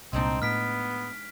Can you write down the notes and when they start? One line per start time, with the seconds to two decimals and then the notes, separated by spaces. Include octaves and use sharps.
0.13 C2 A#2 G#3 C4 D4 D#4
0.42 A2 B3 F6 B6 D7